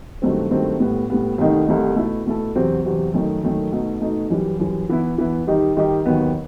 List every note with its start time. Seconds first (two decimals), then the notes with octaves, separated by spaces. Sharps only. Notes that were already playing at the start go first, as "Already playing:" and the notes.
0.22 G2 D#3 F#3 A3 C4
0.51 G2 D#3 F#3 A3 C4
0.80 A2 G3 B3
1.10 A2 G3 B3
1.38 C2 C3 D#3 A3 D#4
1.67 C2 C3 D#3 A3 D#4
1.96 B2 A3 E4 A4
2.26 B2 A3 E4 A4
2.55 E2 C3 F#3 C4
2.85 E2 C3 F#3 C4
3.14 F#2 D#3 A3 D#4
3.43 F#2 D#3 A3 D#4
3.72 B2 A3 D#4 A4
4.01 B2 A3 D#4 A4
4.30 F#2 E3 G3
4.60 F#2 E3 G3
4.89 E3 B3 E4
5.18 E3 B3 E4
5.47 D#3 G3 D#4 G4
5.77 D#3 G3 D#4 G4
6.06 D#2 D#3 F#3 B3